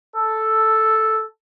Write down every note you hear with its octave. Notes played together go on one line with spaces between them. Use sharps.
A4